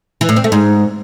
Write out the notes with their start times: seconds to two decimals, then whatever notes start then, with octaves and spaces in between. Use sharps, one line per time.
0.21 E3
0.29 A2
0.36 C4
0.44 A3
0.52 G#2